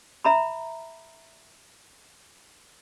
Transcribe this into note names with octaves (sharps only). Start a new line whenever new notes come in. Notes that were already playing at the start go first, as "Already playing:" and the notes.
E5 A#5 B5